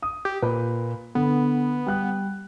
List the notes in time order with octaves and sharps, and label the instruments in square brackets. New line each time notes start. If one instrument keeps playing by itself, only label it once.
[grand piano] D#6
[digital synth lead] G4
[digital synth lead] A#2 [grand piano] B4
[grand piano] D3 [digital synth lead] B3
[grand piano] G3 F#6